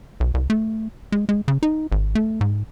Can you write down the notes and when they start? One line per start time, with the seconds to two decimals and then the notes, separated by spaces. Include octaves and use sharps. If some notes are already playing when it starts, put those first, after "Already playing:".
0.20 B1
0.34 C2
0.50 A3
1.12 G#3
1.29 G#3
1.48 C#3
1.63 D#4
1.92 G#1
2.15 A3
2.41 G#2